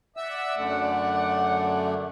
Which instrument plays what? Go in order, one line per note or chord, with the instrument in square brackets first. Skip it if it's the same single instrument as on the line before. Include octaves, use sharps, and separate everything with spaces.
[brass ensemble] D5 F#5 [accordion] E5 E6
[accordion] F#2 D3 A3